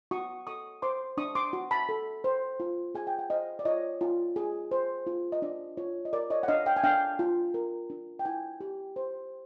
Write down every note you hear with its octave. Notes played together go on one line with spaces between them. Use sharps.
F#4 C#6 D#6
A4 C#6 D#6
C5 C6 D6
D4 C#6 D#6
C6 D6
F#4
A5 B5
A4
C5
F4
G#4 G#5
G5
F#5
C5 D#5 F5
D5
F4 C#5 D#5
F4
G#4
C5
F4
D#5
D4 D5
F4 C#5
D#5
A#4 D5
C#5 D#5
F#5
D4 D#5 F5
F5 G5
G#5
D4 F5 G5
F4
A#4
D4
G5
E4 F#5 G#5
G4
C5